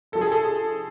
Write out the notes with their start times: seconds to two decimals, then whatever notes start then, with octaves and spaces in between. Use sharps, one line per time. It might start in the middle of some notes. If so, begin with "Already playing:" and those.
0.12 F2 C3 F3 A4
0.21 G#4
0.32 A4
0.43 G#4